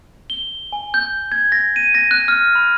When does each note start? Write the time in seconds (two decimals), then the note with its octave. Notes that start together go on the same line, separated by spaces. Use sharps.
0.30 G7
0.73 G#5
0.94 G6
1.32 G#6
1.52 A#6
1.76 D#7
1.95 A#6
2.11 F#6
2.28 F6
2.55 B5